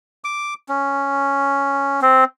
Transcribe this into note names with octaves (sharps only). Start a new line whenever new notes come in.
D6
C#4
C4